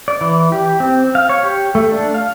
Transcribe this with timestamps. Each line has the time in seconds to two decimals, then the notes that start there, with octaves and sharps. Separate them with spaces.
0.08 D5
0.21 E3
0.52 G4
0.80 C4
1.15 F5
1.29 C#5
1.43 G4
1.75 A3
1.91 D4
2.14 F5